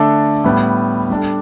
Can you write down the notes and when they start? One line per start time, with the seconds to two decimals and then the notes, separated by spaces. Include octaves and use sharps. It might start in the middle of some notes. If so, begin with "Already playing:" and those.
Already playing: D3 A3 D4 A4
0.44 A2 G3 B3
1.10 G3 D4 A4